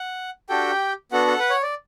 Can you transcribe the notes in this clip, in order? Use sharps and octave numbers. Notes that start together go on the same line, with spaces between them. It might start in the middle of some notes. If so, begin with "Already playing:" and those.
Already playing: F#5
D4 F#4 G4 A4 G5
B3 D4 F#4 A4 F#5
A4
B4
C#5
D5